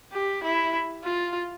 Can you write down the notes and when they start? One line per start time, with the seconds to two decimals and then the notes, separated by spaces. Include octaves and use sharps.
0.13 G4
0.44 E4
1.04 F4